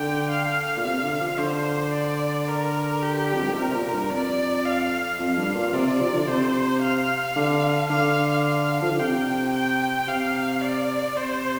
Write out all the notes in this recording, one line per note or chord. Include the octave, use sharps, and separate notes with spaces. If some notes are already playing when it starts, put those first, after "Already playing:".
Already playing: D3 G5
F5
A#2
C3 F5
D3
F3
D3 C5
D5
A#4
G4
F2
G2
A#2
C3 A#4
C3
A#2
G2
F2 D5
F5
F2 F5
G2
A#2
C3 D5
C3
F3
D3
C3 C5
F5
D3
D3 F5
F5
F3
D3
C3 G5
G5
C3 F5
D5
C3 C5